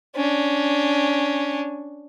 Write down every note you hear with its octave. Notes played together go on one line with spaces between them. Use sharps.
C#4 D4